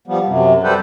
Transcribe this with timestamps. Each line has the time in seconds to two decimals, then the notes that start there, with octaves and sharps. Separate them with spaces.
0.07 F3 G3 B3
0.26 F#2 C3
0.63 G3 G4 A4 B4 C5